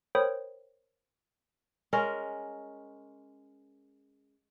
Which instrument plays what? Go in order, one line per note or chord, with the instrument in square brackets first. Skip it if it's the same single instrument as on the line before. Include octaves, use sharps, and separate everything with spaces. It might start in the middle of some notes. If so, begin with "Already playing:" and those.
[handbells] A#4 C5 C#5 G5 B5 D#6
[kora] G#3 C#4 A#4